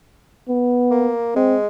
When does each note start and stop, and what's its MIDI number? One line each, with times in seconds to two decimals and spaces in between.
0.49 1.11 59
0.90 1.35 58
1.36 1.67 56
1.36 1.57 60